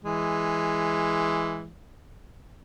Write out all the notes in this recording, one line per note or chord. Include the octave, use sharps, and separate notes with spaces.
E3 G#3